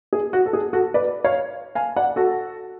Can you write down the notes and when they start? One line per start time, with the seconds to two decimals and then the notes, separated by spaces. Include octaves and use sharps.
0.13 G#4
0.33 F#4
0.46 A4
0.53 G#4
0.73 F#4 A4
0.94 B4 D5
1.24 C#5 F5
1.75 F5 G#5
1.96 D5 F#5
2.16 F#4 A4